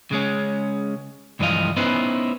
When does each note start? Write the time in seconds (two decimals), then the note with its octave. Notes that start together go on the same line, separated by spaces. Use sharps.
0.11 C#3 G#3 C#4
1.39 C#2 G2 E3 F3 D#5 F5
1.77 B3 C#4 D#4 E4 B4 C5